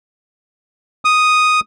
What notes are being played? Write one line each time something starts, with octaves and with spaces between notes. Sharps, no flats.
D#6